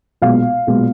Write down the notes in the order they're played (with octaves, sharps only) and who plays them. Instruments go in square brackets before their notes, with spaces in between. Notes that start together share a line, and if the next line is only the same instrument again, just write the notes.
[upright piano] B1 A#2 G#3 B3 F5
B1 A#2 G#3 B3